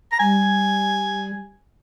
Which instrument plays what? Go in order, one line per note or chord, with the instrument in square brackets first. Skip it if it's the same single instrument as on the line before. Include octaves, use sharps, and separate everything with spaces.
[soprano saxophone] A#5
[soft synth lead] G3 [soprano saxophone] G#5